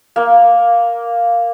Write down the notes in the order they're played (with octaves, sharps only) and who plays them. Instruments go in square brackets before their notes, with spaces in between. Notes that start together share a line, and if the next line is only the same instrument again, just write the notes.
[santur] A#3